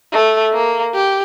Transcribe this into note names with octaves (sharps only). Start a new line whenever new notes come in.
A3
A#3
G4